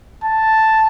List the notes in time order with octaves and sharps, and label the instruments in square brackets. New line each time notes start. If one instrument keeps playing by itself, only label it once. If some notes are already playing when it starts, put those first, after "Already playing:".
[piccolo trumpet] A5